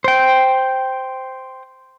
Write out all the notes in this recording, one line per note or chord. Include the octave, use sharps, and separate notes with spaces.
C5 G5